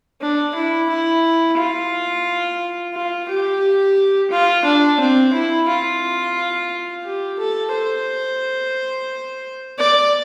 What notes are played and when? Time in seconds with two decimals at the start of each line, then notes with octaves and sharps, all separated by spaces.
0.21 D4
0.55 E4
0.90 E4
1.58 F4
2.94 F4
3.29 G4
4.31 F4
4.65 D4
5.00 C4
5.33 E4
5.68 F4
7.04 G4
7.39 A4
7.72 C5
9.78 D5